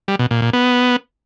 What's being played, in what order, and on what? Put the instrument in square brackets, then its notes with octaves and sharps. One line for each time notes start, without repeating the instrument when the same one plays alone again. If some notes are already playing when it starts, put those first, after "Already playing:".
[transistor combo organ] G3
B2
A#2
A#2
B3